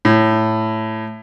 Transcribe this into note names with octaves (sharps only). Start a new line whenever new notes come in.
A2